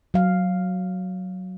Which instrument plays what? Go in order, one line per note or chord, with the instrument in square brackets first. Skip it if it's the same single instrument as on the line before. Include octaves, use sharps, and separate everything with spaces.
[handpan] F#3 F5